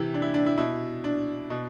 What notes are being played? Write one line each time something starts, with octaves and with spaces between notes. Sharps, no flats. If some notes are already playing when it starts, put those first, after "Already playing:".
Already playing: C3 E3 E4 G4
D4
E4
D4
E4
B2 E4
D4
B2